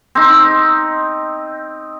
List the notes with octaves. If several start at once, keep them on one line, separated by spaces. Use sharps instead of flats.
C4 D#4